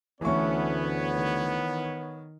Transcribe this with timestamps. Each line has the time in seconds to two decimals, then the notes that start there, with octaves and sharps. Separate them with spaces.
0.21 D2 E3 A3 B3 C#4 C#5 C#6
1.14 D#3